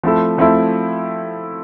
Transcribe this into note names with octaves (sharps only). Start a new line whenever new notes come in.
F3 A3 C4 E4 A4
F3 A3 C4 E4 A4